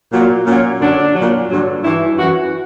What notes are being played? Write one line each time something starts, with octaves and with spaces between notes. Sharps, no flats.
A#2 F#3
A#2 F#3 C#4
F#2 D3 F#3 D4
F#3
A#2
G2 D3 F#3
G2 E3 E4
F#2 E3 F#4